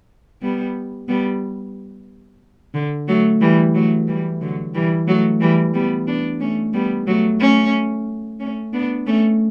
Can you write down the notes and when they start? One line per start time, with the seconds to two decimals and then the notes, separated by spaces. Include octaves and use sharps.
0.42 G3 B3
1.08 G3 B3
2.74 D3
3.08 F#3 A3
3.41 E3 G3
3.74 F#3 A3
4.07 E3 G3
4.41 D3 F#3
4.74 E3 G3
5.07 F#3 A3
5.41 E3 G3
5.74 G3 B3
6.07 B3 D4
6.40 A3 C#4
6.73 G3 B3
7.07 F#3 A3
7.40 A3 C#4
8.40 A3 C#4
8.73 B3 D4
9.07 A3 C#4